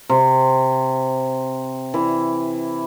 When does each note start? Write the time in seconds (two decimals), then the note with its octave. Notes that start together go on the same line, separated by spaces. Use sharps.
0.10 C3
1.94 E3